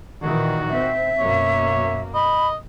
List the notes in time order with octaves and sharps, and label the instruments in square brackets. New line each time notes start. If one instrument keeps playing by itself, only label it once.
[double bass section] A#2 D#3 E3 [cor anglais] F#4
[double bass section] C4 [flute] E5
[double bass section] F#2 B2 A#3 [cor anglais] C#5
[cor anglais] D#5 [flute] B5